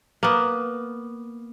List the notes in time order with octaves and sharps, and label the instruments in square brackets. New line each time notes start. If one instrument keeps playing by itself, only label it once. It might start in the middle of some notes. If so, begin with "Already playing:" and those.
[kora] A#3 B3